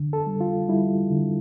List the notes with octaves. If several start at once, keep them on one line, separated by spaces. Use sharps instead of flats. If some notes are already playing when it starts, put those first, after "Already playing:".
Already playing: D3
A4
G3
F4
G3 E4
D3